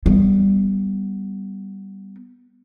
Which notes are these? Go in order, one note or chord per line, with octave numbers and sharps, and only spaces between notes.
G3 B3